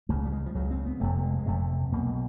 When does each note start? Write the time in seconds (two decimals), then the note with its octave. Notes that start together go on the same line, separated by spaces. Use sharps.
0.09 C#2 C#3 A3
0.25 G3
0.32 G#3
0.46 F3
0.55 C#2 C#3 F#3
0.71 C4
0.86 B3
1.00 F1 F2 C3 A3
1.18 A3
1.24 G#3
1.39 G#3
1.46 F1 F2 C3 A3
1.92 B1 B2 A#3